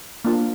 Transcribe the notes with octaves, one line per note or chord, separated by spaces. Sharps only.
A#3 D4 F4